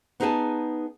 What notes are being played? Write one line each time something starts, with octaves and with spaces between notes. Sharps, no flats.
B3 D#4 G#4 B4 G#5 A5